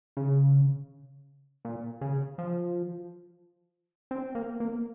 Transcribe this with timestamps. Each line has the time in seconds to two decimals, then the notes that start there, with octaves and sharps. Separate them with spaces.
0.17 C#3
1.65 A#2
2.01 C#3
2.38 F3
4.11 C4
4.35 A#3
4.60 A#3